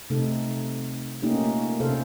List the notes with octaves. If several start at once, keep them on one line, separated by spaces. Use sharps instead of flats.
C3 A3 C4 D#4 A4
A3 A#3 C#4 D#4 F4 G4
C3 C#4 A4 C5 F5